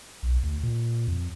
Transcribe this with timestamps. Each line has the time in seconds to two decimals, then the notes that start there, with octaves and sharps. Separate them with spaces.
0.23 B1
0.43 D2
0.63 A#2
1.08 F2